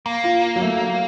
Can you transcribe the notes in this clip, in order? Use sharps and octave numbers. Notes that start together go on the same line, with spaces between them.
A#3
F4
F#3
A3
F#3